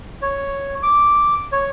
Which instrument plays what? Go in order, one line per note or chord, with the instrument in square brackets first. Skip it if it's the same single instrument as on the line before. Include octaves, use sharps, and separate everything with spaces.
[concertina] C#5
D6
C#5